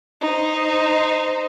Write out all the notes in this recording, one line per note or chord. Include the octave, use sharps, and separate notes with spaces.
D#4 C5